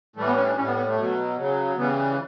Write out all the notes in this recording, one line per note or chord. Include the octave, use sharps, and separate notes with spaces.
A2 E3 G3 A3
B3
C#4
D4
A2 G3 C#4
B3
B3
A3
B2 F#3
C#3 F#3
C#3 E3 G3 B3